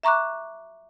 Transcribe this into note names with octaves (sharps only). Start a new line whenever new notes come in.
E5 A#5 C#6 D6 F#6